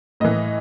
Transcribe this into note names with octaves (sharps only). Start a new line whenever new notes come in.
A2 E3 D#5